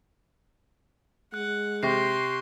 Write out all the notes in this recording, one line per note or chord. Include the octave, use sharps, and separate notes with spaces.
G#3 F#5 F#6
C3 G4 C6 C#6 A#6 C7